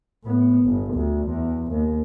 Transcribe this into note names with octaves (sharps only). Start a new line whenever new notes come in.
A2 B3
G1
D2
E2
D#2